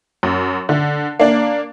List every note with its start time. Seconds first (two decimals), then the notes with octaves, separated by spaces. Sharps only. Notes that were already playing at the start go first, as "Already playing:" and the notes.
0.23 F#2
0.69 D3
1.19 A#3 D4